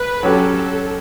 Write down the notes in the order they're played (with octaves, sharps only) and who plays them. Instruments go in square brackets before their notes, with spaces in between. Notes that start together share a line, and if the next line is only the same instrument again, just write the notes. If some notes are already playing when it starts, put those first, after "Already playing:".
Already playing: [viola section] B4
[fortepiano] F#3 C#4 G4 C#5 [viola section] A4